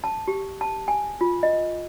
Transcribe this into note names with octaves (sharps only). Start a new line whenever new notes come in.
A5
G4
A5
G#5
F4
D#5